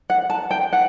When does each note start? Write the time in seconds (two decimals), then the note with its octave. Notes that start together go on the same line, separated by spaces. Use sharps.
0.10 F#5
0.30 A5
0.51 G5
0.73 F#5